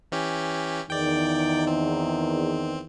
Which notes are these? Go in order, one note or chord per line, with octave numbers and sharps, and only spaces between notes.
E3 C#4 G4
E2 D#3 D5 G5
C4